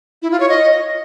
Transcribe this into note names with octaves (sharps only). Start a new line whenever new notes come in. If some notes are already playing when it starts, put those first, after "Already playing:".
E4
F4
C#5
D#5